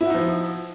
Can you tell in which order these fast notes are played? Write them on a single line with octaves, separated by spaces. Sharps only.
E4 F#4 D#4 F3